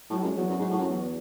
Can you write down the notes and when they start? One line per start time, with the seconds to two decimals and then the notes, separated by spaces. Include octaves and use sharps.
0.10 A2 F#3
0.23 F#2 G#3
0.34 E2 F#3
0.49 F#2
0.59 G#2
0.70 A2
0.80 F#2
0.90 E2